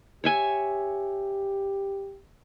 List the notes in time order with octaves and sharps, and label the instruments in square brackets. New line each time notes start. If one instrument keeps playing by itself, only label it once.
[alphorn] G4 [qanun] C#5 E5 G#5